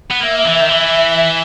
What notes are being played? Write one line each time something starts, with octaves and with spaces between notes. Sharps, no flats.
B3
A#3 E5
E3
D#3
E3